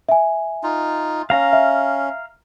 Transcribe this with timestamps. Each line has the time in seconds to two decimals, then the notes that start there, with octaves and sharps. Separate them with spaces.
0.09 E5 G#5
0.63 D#4 F4
1.30 C#4 F5 A#5
1.53 E5